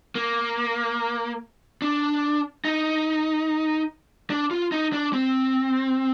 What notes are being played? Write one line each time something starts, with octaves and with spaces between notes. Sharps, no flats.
A#3
D4
D#4
D4
F4
D#4
D4
C4